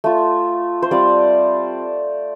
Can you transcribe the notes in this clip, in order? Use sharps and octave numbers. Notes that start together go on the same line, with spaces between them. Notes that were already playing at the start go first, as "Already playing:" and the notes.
A3 F4
C5
G3 C4 F4 D5